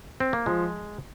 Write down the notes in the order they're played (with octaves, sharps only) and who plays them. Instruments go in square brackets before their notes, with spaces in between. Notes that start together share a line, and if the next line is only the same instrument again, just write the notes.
[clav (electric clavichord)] C4
A#3
[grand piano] F3 [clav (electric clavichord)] G#3